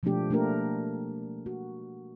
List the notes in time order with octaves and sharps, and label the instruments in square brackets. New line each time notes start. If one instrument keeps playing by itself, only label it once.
[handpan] B2 F3 G#3 A3 D4 G4
A3 A#3 D4 G4 A#4
F#4